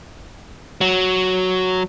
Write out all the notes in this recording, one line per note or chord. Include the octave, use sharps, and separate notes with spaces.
F#3